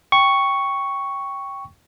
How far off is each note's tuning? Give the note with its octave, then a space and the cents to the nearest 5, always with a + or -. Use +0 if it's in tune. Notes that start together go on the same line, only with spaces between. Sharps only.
G5 +0 C#6 +0